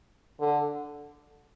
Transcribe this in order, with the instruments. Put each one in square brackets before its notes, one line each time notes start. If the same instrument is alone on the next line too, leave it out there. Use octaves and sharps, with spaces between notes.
[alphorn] D3